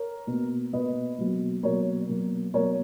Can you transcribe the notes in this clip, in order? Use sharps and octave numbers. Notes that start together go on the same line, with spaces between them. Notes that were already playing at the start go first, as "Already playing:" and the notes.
Already playing: A#4 C#5
B2 A#3
B2 A#3 B4 D#5
B2 F#3 A#3
B2 F#3 A#3 A#4 C#5
B2 F#3 A#3
B2 F#3 A#3 A#4 C#5